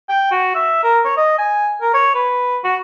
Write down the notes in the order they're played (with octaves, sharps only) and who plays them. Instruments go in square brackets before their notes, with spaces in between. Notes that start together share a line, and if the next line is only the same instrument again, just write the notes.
[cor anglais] G5
F#4
E5
A#4
C#5
D#5
G#5
A#4
C#5
B4
F#4